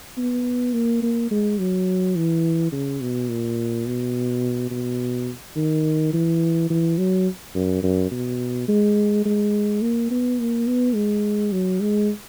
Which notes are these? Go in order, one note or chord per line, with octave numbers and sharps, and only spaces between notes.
B3
A#3
A#3
G#3
F#3
E3
C#3
B2
A#2
B2
B2
D#3
E3
E3
F#3
F#2
F#2
B2
G#3
G#3
A#3
B3
A#3
B3
G#3
F#3
G#3